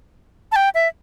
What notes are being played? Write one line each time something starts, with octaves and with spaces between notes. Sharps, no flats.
A5
G5
E5